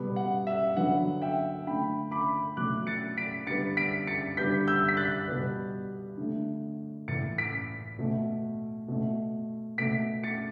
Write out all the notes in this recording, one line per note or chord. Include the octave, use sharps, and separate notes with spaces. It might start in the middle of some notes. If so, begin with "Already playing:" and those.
Already playing: B2 G3 B3
F#5
E5
D3 F#3 B3 F#5
E5 G5
D3 A3 G5 B5
B5 D6
B2 F#3 A3 D6 F#6
A6 C#7
B6 D7
D3 G3 B3 A6 C#7
B6 D7
A6 C#7
D3 G3 B3 G6 B6
E6 G6
B6
F#6 A6
B2 G3 B3
D3 A3
A2 E3 A3 A6 C#7
B6 D7
B2 A3
B2 A3
B2 A3 B6 D7
A6 C#7